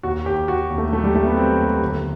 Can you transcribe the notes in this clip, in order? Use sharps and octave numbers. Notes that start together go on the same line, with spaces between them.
D#2 F#4
D#2 G4
D#2 F#4
D#2
A3
F#3 A3
G3
D#2 A3
B3
F#3 C4
D#2
G1